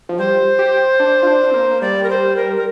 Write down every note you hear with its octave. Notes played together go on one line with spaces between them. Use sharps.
F3
G3 C5
G4
D4
F4
D4
C4
A#3
G3 D5
A#4
C5
A#4
A#4